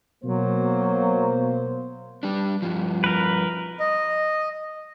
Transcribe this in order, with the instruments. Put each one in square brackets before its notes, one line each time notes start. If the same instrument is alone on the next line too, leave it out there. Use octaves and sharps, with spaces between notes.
[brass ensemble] B2 A#3 C5 [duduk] F#3
[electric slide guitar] G3 D4
G2 F3
[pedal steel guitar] A#4 B4
[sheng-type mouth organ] D#5